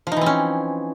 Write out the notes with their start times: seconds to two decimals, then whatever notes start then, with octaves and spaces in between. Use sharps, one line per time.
0.07 F3
0.12 D#4
0.17 E3
0.21 C4
0.26 C#4